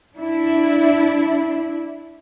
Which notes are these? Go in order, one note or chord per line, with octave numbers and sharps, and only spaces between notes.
D4 E4